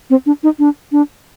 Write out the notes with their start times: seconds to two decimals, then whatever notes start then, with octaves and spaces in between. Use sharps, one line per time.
0.10 C4
0.26 D4
0.43 D#4
0.59 D4
0.92 D4